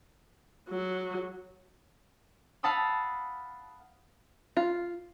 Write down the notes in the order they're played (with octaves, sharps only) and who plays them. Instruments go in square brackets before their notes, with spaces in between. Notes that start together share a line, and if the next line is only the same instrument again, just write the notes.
[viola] F#3
[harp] F5 F#5 A5 B5 D#6 E6
[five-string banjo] F4